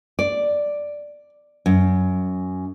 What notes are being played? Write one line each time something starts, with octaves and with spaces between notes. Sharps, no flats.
D5
F#2